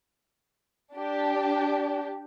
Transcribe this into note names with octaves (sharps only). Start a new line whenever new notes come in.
D4 G4